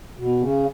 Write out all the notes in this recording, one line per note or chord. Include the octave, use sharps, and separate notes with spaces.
B2
C#3